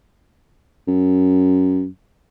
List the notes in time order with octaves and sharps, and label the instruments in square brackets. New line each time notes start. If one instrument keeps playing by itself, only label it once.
[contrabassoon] F#2